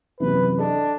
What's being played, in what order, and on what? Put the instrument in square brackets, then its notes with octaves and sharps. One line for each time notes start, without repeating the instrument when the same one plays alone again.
[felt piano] F#2 C3 E3 [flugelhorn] B4
[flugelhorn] D4 [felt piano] A4 D#5